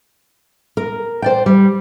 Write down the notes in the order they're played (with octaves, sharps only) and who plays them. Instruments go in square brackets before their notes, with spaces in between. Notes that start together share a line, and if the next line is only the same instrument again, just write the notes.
[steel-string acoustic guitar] A#4
C5 D5 G5
G3